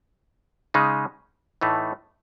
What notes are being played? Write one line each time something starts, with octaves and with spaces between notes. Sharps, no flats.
C#3 G#3 D#4
A2 E3 A3 D#4